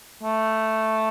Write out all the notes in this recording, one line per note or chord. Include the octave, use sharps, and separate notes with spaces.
A3